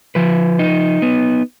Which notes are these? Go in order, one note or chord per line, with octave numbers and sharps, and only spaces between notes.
F3 B4
D#4
B3